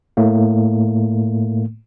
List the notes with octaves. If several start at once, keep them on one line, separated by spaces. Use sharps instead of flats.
A2 A3 A#3